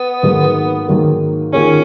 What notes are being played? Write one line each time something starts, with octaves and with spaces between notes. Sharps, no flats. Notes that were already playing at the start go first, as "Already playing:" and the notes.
Already playing: B3
G#2 D#3 F#3 A#3
G#2 D#3 F#3 A#3
D#3 A#3 C#4 F4 G#4 C#5